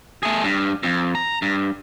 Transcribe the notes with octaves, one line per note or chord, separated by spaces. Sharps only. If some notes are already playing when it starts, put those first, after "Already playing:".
A3 G#4
G2
F2
A#5
G2